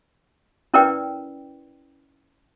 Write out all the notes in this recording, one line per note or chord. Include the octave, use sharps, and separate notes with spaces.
C#4 E4 A#4 B4 D5 G5